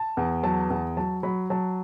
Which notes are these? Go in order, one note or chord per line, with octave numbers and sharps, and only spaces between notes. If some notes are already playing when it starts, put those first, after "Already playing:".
Already playing: A5
E2
F#3 A5
E2
F#3 A5
F#3 B5
F#3 A5